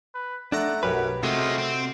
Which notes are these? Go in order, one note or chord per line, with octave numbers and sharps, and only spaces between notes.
B4
A3 D4 F#5 A#5
B1 F#2 G4 B4 F#5
C3 G#3 A3 F4 F#4 C5
C4